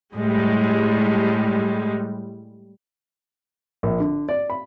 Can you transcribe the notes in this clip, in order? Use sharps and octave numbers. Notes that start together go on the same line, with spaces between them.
A2 G3 G#3
A#1
D3
D5
B5